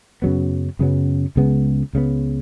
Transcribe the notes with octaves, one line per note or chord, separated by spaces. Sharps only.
F#2 C#3 F#3 B3
F#2 C#3 F#3 B3
C#2 C#3 G#3 B3
C#2 C#3 G#3 B3